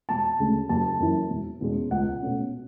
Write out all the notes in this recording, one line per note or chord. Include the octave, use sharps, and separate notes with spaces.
E1 A5
D2 C#3 G#3
F#1 A5
F#2 E3
E1
E2 B2 G#3 C#4
C#2 F#5
B2 A3 C#4